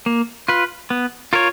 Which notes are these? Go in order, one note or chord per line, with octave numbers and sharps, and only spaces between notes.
A#3
F4 B4
B3
F4 A#4 C#5